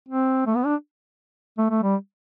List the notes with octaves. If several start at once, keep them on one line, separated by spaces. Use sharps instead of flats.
C4
A3
B3
D4
A3
A3
G3